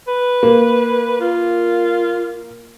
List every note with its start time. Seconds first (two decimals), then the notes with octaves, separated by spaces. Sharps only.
0.08 B4
0.43 A#3
1.20 F4